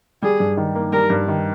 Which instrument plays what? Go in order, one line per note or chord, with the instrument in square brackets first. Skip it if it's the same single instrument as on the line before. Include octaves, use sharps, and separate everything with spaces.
[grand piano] G3 [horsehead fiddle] G#4
[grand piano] G2
D#3
A#3
[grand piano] G3 [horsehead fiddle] A#4
[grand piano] G2
D#3